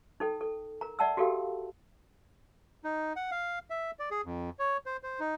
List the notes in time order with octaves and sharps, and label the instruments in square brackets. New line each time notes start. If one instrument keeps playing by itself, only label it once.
[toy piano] D#4 A4 G5
A4
A#4 A#5
D5 E5 F#5 A5 A#5 E6
F#4 G4 A4 A#4 F5 G5
[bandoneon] D#4
F#5
F5
E5
D5
G#4
F2
C#5
C5
C5
D#4